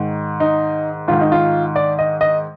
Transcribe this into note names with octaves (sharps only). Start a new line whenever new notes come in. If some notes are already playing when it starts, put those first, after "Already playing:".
Already playing: G#2 D#3
D#4
G#2 D#3 F4
D#4
F4
D5
D#5
D#5